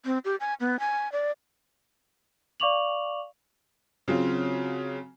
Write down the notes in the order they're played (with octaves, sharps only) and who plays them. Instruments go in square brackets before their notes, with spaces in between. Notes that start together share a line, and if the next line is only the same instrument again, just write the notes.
[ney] C4
G4
G#5
B3
G#5
D5
[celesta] D5 F5 C#6 D6 F7 F#7
[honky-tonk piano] C#3 F#3 C4 F4